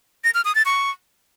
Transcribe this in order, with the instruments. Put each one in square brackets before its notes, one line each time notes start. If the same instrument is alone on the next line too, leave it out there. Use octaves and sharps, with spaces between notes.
[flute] A#6
F6
D#6
A6
C#6